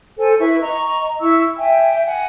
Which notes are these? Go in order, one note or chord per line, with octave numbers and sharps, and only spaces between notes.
A4 C5 G#5
E4 B4 C#6
D#5 A#5 C#6
E4 C#6 E6
E5 G5 G#5
F#5 G#5